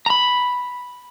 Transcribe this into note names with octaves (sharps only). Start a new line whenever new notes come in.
A#5 B5